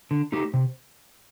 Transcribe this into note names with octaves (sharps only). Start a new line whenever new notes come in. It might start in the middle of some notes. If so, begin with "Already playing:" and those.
D3
A3 D#4 G4
C3